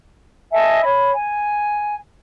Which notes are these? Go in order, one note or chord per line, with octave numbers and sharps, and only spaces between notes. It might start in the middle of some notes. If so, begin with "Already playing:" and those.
D#5 E5 G#5 A5
C#5 B5
G#5